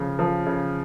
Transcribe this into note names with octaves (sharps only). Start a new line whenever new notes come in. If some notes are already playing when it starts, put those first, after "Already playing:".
Already playing: C#3 F3
F3
C#3